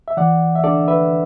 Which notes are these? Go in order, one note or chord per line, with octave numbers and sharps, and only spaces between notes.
E5
E3 D5 F#5
E5
D4 A4 D5
B4 E5